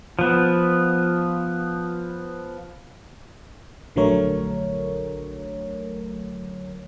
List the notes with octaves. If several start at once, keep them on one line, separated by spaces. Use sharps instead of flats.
F3 B3
A#1 D3 F#3 A3 A#4 C#5